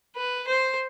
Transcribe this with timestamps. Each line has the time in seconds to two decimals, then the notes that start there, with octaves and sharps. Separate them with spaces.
0.16 B4
0.48 C5